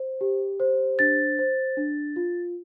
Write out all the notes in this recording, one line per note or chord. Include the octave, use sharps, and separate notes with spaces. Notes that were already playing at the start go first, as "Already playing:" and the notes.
Already playing: C5
G4
C5
D4 A6
C5
D4
F4